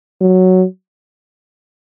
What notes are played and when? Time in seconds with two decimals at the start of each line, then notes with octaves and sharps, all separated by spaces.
0.21 F#3